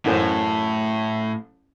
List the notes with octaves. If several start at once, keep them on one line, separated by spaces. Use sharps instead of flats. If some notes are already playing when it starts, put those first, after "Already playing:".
A1 F#2 A2 C5